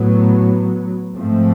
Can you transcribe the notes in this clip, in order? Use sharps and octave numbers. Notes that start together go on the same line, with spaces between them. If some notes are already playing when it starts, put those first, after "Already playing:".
Already playing: A2 F#3 B3
G#2 F3 A3 C4